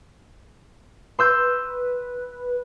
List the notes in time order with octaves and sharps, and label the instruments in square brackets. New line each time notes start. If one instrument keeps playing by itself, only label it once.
[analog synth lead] B4 [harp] C6 E6 G6